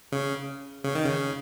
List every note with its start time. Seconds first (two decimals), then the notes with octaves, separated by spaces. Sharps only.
0.12 C#3
0.84 C#3
0.95 D#3
1.05 C#3